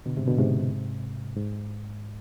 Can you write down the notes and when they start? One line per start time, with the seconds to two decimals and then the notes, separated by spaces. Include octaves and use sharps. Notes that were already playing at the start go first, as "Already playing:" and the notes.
0.06 B2 D3
0.17 G#2 C3
0.27 B2 D3
0.39 G#2 C3
1.36 G#2